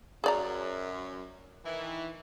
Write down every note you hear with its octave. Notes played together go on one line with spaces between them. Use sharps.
F#2 G#4 D5 A#5
D#3 E3 E4